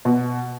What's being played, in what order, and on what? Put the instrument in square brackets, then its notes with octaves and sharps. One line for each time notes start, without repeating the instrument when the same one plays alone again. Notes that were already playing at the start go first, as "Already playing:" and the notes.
[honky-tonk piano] B2